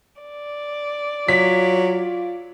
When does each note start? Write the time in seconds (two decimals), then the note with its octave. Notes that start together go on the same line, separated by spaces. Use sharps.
0.20 D5
1.28 F#3 F4 B6